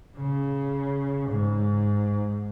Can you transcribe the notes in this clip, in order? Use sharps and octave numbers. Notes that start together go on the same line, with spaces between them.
C#3
G#2